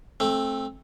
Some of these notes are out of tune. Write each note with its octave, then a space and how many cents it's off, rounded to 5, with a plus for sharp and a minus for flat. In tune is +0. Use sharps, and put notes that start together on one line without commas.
A3 -15 C4 +20